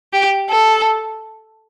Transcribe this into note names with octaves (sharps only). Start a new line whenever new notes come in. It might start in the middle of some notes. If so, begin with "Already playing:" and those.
G4
A4